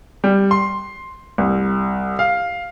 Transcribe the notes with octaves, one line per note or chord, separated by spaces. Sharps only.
G3
C6
C2
F5